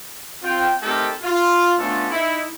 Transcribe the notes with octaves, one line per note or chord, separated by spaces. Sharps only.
C4 F4 G5
A3 C4 D#4 G4 A4 A#4
F4
A3 B3 C#4 D4 F4 A4
D#4 E4